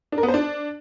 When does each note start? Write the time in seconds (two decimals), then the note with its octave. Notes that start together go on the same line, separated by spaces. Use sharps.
0.12 D4
0.18 A#4
0.23 B3
0.28 C5
0.34 D4